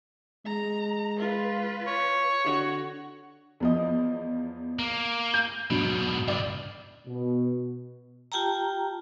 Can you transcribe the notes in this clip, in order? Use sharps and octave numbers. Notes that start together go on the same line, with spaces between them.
G#3 A#5
F4 B4
C#5
D3 F#4
E2 F3 D#5
A#3
G6 D#7
G#2 B2 F#3 D4
C#2 G2 D5
B2
F4 G4 G5 A5 A#5